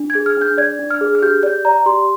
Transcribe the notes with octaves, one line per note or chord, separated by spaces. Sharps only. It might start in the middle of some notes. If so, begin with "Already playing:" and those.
Already playing: D4
G#6
G#4
F6
D4 G6
D5 G#6
D4
F6
G#4
F6
G4 G6
D5 G6
D5 A#5
G4 C6